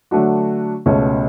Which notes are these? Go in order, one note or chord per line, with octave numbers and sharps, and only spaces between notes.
D3 F#3 A3 D4 F#4
C#2 B2 A3 C#4